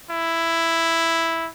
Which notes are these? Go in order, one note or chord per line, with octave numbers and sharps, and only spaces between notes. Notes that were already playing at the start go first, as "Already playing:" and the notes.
E4